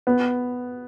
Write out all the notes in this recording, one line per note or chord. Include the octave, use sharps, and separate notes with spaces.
B3